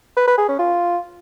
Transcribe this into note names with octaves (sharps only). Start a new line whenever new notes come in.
B4
B4
G#4
C#4
F4